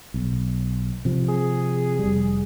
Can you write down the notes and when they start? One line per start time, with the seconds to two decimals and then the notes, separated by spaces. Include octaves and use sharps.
0.14 B1
1.05 C3 F3
1.29 G#4
1.99 F1 G3